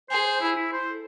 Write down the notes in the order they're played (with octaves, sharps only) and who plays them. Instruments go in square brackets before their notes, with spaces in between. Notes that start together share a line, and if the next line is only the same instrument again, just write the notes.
[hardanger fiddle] G#4 [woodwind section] C5
[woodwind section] C5
E4
E4
C5
A4